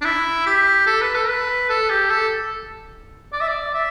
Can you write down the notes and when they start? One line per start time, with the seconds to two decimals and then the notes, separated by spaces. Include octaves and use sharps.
0.01 D4
0.05 E4
0.46 G4
0.87 A4
1.01 B4
1.14 A4
1.28 B4
1.69 A4
1.90 G4
2.10 A4
3.33 D5
3.41 E5
3.48 D5
3.74 E5